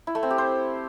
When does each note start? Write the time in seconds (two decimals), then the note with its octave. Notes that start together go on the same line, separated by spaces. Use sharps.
0.07 E4
0.15 A3
0.23 C4
0.30 G4
0.38 C5